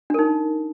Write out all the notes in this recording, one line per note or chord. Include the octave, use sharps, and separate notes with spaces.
D4 D#4 A#4